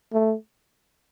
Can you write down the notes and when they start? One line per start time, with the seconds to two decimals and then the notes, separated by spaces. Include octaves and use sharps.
0.13 A3